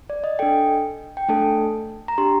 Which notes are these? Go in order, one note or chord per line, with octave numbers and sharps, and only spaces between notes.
D5
D#5
D4 A4 G5
G5
A3 D4 A4 A5
A#5
D4 G4 C6